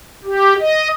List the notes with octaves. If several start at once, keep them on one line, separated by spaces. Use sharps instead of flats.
G4
D#5